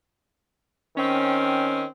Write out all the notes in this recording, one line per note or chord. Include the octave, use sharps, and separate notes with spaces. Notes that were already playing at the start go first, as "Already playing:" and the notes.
D#3 C4 C#4